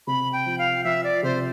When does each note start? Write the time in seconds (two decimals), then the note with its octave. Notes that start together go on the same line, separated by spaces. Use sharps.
0.07 C3 B5
0.32 G5
0.46 F3
0.58 F5
0.84 F3 E5
1.04 D5
1.23 C3 C5